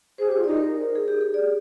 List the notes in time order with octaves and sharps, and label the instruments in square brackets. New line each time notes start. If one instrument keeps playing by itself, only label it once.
[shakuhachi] G#4 [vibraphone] C5
[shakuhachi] G4 [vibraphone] C5
[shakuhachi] F4
[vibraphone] D5
[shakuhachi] D#4
[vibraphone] A#4
G#4
G4
G#4
D5